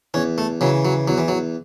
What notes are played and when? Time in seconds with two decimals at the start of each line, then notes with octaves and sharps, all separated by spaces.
0.14 E2 C#4
0.38 A3
0.61 C#3 E3 F#3
0.85 F#3
1.08 E2 F#3
1.18 E3
1.28 F#3